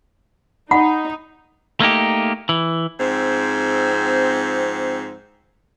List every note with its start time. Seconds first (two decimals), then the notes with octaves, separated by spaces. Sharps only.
0.71 D#4 F#5 B5
1.80 A3 A#3 D#4 G4
2.49 E3
2.99 G#2 F3 C4